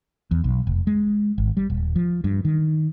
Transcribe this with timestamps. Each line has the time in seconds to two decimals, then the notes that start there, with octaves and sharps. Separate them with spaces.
0.31 E2
0.44 B1
0.67 F1
0.87 G#3
1.38 G#1
1.57 G3
1.70 D#1
1.96 F3
2.24 G2
2.45 D#3